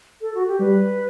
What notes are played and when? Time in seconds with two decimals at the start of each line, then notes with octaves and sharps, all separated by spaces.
0.21 A4
0.35 F#4
0.48 G4
0.60 G3 B4